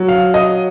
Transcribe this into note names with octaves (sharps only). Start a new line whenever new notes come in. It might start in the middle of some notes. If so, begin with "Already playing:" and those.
Already playing: F#3
F5
D#5